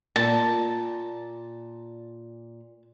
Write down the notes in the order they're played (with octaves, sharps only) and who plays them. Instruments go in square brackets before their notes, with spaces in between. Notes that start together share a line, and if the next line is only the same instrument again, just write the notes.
[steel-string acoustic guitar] A#2 [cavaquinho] A5